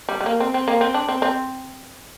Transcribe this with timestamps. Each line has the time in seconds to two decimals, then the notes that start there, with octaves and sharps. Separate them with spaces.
0.09 G3
0.21 G3
0.26 A#3
0.40 C4
0.54 C4
0.68 A#3
0.81 C4
0.94 D4
1.09 C4
1.22 C4